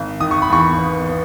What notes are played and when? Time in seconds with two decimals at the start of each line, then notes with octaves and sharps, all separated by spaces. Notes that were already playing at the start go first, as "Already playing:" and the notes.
Already playing: G#1
0.20 D#3 D#6
0.31 C#6
0.42 B5
0.50 E2 C#6
0.79 B3
1.09 B3